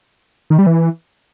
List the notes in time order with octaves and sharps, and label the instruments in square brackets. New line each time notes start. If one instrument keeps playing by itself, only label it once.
[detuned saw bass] D#3
G3
E3